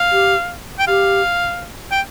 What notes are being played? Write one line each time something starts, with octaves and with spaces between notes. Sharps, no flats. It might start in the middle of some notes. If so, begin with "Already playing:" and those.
Already playing: F5
G4
G5
G4 F5
G5